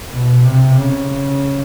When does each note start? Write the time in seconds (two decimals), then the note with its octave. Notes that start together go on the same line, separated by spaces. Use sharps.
0.13 B2
0.44 C3
0.76 C#3